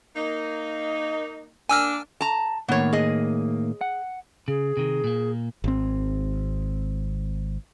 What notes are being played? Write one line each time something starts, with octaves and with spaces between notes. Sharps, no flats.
A#3 D#4
A#3 D4 G#5 E6 F6
A5 A#5
A2 D#3 A#3 B3 C#5
G#4 D#5
F#5
C#3 G#4
C3 D#3
A#2 A#3
G#1 C4